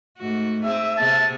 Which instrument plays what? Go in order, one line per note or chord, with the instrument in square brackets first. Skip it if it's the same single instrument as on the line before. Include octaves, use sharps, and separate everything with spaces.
[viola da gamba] G#2 A3 F#4
[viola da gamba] C4 G#4 [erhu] E5
[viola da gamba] C3 B3 G#4 [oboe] A5